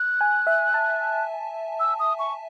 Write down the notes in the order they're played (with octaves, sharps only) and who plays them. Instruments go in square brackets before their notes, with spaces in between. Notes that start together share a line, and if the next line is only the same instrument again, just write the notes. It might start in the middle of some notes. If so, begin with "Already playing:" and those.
Already playing: [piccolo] F#6
[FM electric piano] G#5
E5
A5
[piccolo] E6
D#6
C#6